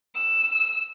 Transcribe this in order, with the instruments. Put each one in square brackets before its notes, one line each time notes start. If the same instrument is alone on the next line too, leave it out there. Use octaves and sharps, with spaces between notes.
[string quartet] E6